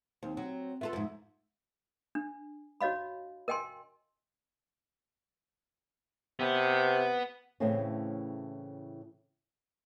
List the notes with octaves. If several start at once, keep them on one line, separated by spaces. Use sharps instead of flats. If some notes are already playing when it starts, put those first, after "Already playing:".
D#2 C4
F#3 C4
B3 F4 A4 E5
F2 G#2
D4
F#4 C#5 D#5 F5 B5
A#4 D#5 G5 G#5 C6
C3 B3
A2 C#3 E3 A3 C4 C#4